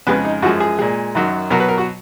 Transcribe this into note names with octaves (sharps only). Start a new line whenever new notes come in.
F2 C#3 G#3 B3
D#4
F#2 F3 G#3 F#4
G#4
A#2 G#3
F#2 D#3 F#3
B2 F#3 A#4
B4
A#4
F#4